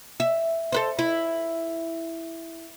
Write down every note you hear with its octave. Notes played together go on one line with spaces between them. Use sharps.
E5
A4 B4 C5
E4